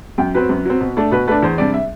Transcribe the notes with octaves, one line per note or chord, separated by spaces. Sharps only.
F#2 G5
F#3 C4 B4
F#2
F#3 C4
B2
A3 D4
B2 B4
A3 D4 B4
E2 C5
C3 G3 D4 D5
E5